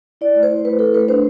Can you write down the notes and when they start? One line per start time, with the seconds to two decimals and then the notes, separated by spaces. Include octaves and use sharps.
0.21 E4 D5
0.35 A3
0.43 C5
0.51 E4
0.65 A3 B4
0.79 E4 A4
0.94 A3 B4
1.08 D4 C5